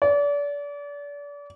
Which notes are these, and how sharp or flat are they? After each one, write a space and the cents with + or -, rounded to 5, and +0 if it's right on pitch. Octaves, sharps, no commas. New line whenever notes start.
D5 -35